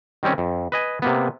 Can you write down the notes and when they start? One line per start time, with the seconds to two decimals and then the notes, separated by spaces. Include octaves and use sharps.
0.23 D#3 G3 C4 C#4
0.38 F2
0.72 B4 D#5 G#5
1.02 C3 A#3 B3